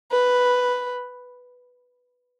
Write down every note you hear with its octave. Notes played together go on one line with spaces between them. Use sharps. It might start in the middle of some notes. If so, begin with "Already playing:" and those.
B4